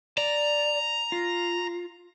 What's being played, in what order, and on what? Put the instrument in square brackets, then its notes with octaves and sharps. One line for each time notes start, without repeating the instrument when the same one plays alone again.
[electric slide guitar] D5 [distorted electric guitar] A#5
[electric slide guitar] F4